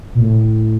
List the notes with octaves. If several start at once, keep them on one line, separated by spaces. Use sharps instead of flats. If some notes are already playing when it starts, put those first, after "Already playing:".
A#2
A2